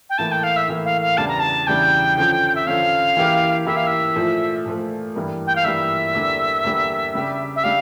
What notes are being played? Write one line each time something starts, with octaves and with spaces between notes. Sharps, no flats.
G5
A2 E3 A#3 A5
G5
F5
E5
A2 E3 A#3
F5
F5
E2 C#3 E3 G3 D4 A5
A#5
A5
E2 C#3 E3 G3 D4 G5
D3 F3 C#4
E5
D3 F3 C#4 F5
E3 A#3 E4 G4
E3 A#3 E4 G4 E5
F5
E5
A#2 F3 A3
A#2 F3 A3
G2 E3 G3 A#3
G5
F5
G2 E3 G3 A#3 E5
E2 D3 G3 A#3 D4
E2 D3 G3 A#3 D4
C#3 G3 D4 G4
E5
G3 D4 G4 F5